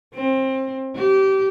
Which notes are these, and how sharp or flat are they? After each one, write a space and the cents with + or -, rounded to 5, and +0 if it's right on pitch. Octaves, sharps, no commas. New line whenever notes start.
C4 +25
G4 -25